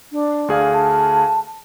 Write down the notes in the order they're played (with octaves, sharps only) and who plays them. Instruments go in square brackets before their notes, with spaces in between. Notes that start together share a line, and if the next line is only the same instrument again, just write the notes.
[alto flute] D4
[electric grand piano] D2 G#4 F5
[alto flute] A5